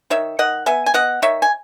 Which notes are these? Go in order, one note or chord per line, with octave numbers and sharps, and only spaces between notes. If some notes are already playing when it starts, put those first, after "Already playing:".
D#3 C#5 E5
D#3 D#5 F#5
B3 E5 G#5
G#5
B3 D#5 F#5
D#3 C#5 E5
G#5